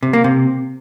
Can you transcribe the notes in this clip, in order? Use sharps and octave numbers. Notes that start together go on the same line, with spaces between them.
C3
A#3
C3